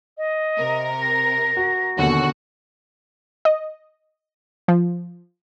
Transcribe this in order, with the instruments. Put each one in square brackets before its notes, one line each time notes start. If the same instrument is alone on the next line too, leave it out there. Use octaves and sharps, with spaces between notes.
[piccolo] D#5
[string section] C3 A#4
[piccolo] A#6
[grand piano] F#4
[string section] D#2 F#4 F#5 [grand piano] B2 D3 C#4
[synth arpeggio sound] D#5
F3